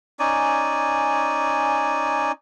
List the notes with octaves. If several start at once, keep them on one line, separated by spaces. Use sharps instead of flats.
C#4 D#4 D5 G#5